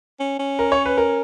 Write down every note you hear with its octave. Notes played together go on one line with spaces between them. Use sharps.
C#4
C#4
A#4
C#5
B4
A#4